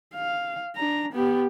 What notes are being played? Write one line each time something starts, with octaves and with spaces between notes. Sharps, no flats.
F5
D4 A#5
B3 G4